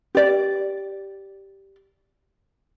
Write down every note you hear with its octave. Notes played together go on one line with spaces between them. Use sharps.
G4 D5